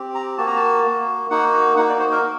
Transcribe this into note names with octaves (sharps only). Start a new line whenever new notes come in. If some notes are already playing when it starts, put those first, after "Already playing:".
Already playing: C4 G4
A#5
A#3 F#4 A5
A#5
A5
A#3 F#4
A#3 D#4 F#4 F#5
A#3 D#4 F#4 F#5
D5
C5
A#4
A#3